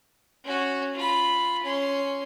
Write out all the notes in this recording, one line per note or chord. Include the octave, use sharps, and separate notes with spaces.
C#4 F#4
F4 B5
C#4 C6